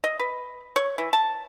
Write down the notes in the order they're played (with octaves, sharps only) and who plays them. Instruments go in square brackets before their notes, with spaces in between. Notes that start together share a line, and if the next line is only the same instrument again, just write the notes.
[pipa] D#5
B4
C#5
E3
A5